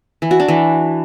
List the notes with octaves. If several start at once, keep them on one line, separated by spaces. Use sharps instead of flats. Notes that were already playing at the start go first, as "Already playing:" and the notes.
E3
F#4
D4
E3